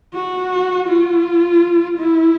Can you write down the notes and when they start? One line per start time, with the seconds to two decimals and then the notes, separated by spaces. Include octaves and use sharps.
0.14 F#4
0.89 F4
1.98 E4